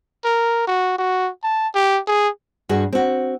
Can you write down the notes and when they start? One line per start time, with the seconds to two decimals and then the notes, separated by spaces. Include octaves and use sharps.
0.24 A#4
0.67 F#4
0.98 F#4
1.43 A5
1.75 G4
2.07 G#4
2.69 G2 F#4 G#4
2.93 C4 F#4